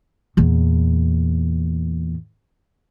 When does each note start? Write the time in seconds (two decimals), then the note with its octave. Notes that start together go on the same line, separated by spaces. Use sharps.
0.37 E2 A#2